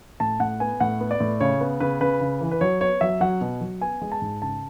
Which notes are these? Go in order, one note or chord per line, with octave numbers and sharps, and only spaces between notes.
A2 A5
A2 F#5
B3 G#5
A2 F#5
B3
D5
A2
C#3 C#5
B3
C#3 B4
C#3 B4
C#3
E3
B4
F#3 C#5
B3 C#5
F#3 E5
F#3 F#5
B2
F#3
B3 G#5
G#3
A5
G#2
C#3 A5